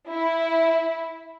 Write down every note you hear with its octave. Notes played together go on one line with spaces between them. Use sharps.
E4